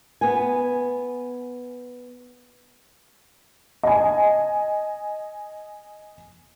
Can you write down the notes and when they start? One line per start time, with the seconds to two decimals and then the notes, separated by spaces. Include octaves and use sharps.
0.21 B3 G#5
3.83 D#5 G#5